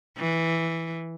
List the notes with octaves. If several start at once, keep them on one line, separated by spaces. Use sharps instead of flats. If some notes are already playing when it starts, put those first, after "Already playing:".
E3